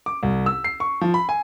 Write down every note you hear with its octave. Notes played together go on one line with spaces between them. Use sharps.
D6
C2
E6
C7
C#6
F3
B5
G#5